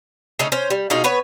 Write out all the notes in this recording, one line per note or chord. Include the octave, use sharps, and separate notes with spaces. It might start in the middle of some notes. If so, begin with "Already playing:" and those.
C#3 A3 C#4 D#4
C#4 C5
G3
B2 G#3 D#4 F4
B3 B4 C#5